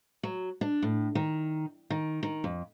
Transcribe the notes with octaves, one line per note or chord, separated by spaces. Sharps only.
F#3
D4
A2
D#3
D#3
D#3
F2